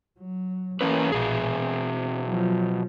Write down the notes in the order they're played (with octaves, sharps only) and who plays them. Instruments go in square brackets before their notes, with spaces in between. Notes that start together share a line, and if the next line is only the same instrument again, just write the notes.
[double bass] F#3
[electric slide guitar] E3 C#4 B4 [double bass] A#3
[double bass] A#1 [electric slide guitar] B2 G#4
[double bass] C4
F3 F#3